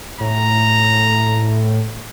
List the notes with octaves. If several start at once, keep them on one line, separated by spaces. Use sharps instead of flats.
A2 A#5